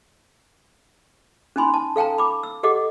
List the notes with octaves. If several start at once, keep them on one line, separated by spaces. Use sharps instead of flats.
C#4 D#4 G#5 B5 C6
A5
A4 F5 G5 A5 A#5
B5 D6
E6
G4 A4 D#5 F#5 D6